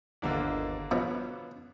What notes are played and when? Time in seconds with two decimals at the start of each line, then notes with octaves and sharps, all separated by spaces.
0.22 G1 D#2 D3 A#3 D4 E4
0.91 B2 F3 B3 C#5